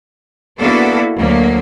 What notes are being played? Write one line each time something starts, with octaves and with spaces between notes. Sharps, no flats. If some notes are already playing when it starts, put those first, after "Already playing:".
A#3 B3 D4 E4 F#4 A4
D2 F#3 A#3